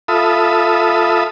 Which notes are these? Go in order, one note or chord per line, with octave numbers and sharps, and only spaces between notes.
F4 A4 E5 B5 D#6